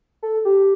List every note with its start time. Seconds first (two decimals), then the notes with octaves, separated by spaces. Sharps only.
0.23 A4
0.45 G4